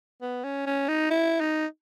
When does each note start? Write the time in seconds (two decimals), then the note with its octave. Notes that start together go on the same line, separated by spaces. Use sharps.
0.22 B3
0.44 C#4
0.66 C#4
0.88 D#4
1.11 E4
1.40 D#4